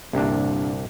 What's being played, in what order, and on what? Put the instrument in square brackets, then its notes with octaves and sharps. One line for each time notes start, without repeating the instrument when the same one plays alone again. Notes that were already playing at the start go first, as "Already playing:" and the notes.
[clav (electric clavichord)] C2 D4 [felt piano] G2 A#2 D3